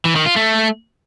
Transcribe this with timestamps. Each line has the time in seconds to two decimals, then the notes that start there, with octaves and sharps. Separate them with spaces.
0.05 E3
0.16 D#3
0.26 F4
0.36 A3